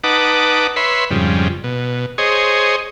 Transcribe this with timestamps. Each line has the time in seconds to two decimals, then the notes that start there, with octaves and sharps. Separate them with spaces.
0.04 D#4 B4 F#5 A5 D6
0.76 B4 C#5 E5 B5 C6
1.10 F2 G#2 C#3 G3
1.64 B2
2.18 G#4 C5 C#5 D#5